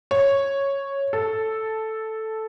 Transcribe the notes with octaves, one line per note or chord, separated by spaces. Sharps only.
C#5
A4